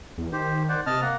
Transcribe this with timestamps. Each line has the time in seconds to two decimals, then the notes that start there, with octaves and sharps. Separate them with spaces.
0.18 E2
0.32 D#3 G4 C5
0.69 C5 D5 F#5
0.86 C3 D#5 A5 F6
1.02 A#3 F#5 A#5